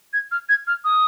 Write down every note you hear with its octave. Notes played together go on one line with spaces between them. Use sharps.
G#6
F6
G#6
F6
D#6